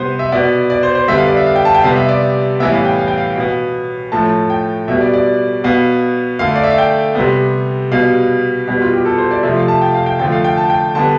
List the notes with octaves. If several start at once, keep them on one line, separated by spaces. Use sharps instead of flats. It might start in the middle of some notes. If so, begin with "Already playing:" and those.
Already playing: C3 G3 B3 B4 C5
E5
B2 B3 D5
D5
C5
C5
D3 G3 B3 E5
F5
D5
E5
F5
G5
A5
G5
C3 G3 B3 F5
E5
D5
A2 E3 G3 B3 E5
F5
G5
F5
G5
F5
B2 B3
A2 F3 A3 A5
G5
B2 G3 B3 E5
D5
D5
B2 B3 F5
D3 A3 F5
D5
E5
F5
G5
C3 G3 B3
B2 G3 B3 F5
B2 G3 B3
F4
G4
A4
C5
D5
C3 F3 A3 E5
F5
A5
G5
F5
G5
D3 F3 A3 G5
F5
G5
A5
G5
D3 G3 B3 A5